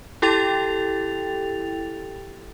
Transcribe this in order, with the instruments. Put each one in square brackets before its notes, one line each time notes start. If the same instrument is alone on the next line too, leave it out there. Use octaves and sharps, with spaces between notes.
[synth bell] E4 G4 A4 G5 A6 F7